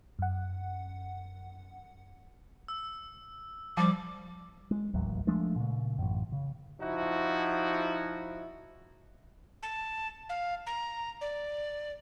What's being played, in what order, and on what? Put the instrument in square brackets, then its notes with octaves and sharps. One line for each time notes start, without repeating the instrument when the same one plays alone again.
[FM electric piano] F#2 F#5
[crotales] E6
[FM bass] F3 [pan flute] G3 [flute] D6
[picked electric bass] G#3
D1 A1 D#2 F#3
F3 G#3 A3 D4
A#2 C#3
A1 F#2
C#3
[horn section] F3 D#4 E4 F#4
[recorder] A5
F5
A#5
D5